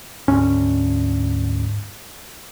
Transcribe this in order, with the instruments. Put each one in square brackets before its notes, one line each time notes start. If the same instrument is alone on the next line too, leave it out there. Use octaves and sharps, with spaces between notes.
[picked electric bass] D2 C#4 [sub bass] G#2